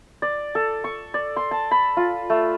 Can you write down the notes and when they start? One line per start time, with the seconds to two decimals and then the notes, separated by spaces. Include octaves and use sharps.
0.22 D5
0.55 A4
0.84 C#6
1.14 D5
1.36 C6
1.51 A5
1.71 B5
1.97 F4
2.30 A3